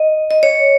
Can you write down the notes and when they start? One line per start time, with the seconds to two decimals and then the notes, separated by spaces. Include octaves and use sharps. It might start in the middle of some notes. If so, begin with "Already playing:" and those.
Already playing: D#5
0.31 D#5
0.43 C#5